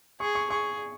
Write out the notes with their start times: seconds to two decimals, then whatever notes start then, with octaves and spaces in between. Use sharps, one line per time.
0.20 G#4 C#6
0.35 C#6
0.50 G#4 C#6